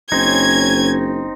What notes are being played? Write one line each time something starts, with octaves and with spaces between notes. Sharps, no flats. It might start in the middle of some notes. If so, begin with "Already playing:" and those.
F#1 C4 C#4 D#4 G#6